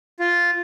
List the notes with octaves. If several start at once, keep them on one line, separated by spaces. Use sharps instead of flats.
F4